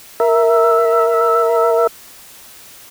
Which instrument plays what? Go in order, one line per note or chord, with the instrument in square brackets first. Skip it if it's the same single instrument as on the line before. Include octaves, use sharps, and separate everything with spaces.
[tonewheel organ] A#4 E5